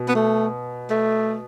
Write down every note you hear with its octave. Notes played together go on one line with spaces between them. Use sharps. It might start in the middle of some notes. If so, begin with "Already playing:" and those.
Already playing: B2
B3
A3
A3